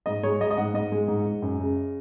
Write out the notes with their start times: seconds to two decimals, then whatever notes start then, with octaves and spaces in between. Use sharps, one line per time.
0.06 G#2 D#5
0.23 G#3 C#5
0.40 G#3 D#5
0.51 D#5
0.57 G#2 F#5
0.74 G#2 D#5
0.92 G#3
1.08 G#2
1.26 G#2
1.42 F#2
1.60 C#3